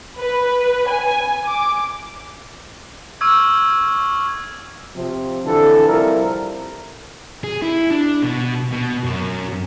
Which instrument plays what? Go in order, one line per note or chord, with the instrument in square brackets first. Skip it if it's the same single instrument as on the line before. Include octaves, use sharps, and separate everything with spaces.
[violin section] B4
G#5
D6
[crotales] C#6 D6 E6 F6 G#6
[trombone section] C3 F3
F2 D3 E3 A4
C3 F3 G3 E4 A#4
[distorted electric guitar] G#4
E4
D4
B2
B2
F#2